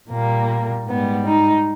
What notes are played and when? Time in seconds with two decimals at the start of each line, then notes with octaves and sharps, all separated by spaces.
0.11 A#2 G3 A#3
0.87 G#2 G3 B3
1.26 D#4